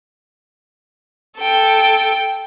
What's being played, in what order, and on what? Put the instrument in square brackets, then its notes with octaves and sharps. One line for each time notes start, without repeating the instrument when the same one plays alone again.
[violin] A4 G5